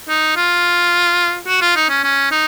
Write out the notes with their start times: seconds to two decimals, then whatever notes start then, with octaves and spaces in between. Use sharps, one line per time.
0.09 D#4
0.37 F4
1.47 F#4
1.61 F4
1.76 D#4
1.89 C#4
2.03 C#4
2.31 D#4